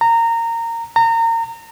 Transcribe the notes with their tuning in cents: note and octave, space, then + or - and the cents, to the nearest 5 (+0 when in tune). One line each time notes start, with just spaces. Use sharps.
A#5 -20
A#5 -30